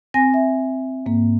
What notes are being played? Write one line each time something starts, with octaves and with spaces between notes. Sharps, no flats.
C4 G#5 A#6
E5
G#2 A#3